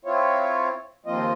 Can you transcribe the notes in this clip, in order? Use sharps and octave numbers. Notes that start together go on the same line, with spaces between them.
C4 E4 F4 C#5
D#2 F3 A#3 C4 F4 D#5